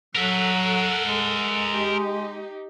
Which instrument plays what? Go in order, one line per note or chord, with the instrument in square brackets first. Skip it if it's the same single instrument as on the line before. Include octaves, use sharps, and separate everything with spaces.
[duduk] F#3 [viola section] A4 F#5 [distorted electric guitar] A#4 E5
[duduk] G#3
[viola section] D#4 G4